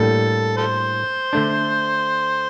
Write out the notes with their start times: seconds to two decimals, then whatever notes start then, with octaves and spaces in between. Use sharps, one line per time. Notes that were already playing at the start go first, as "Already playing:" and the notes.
Already playing: A2 G3 A#3 D4 A4
0.57 A4 C5
1.33 D3 A3 D4